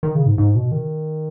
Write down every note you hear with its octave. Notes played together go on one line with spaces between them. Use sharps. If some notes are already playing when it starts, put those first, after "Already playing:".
D#3
C#3
G#2
G#2
B2
D#3